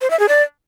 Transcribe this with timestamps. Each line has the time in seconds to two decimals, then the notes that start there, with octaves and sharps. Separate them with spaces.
0.01 C5
0.10 E5
0.19 G#4
0.29 D5